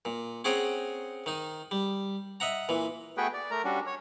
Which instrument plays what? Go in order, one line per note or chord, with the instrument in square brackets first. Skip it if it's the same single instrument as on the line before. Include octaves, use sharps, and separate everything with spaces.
[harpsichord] A#2
C4 C#4 G#4 F#5 G5 A#5
D#3 D#4
G3
D#5 E5 F#5 A#5
A#2 E3
[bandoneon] A3 B3 F#4 G#4 B4 G5
D5
A3 A#4 A#5
G3 C#4 D4 F#4
C#5